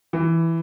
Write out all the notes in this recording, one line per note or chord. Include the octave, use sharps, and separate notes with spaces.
E3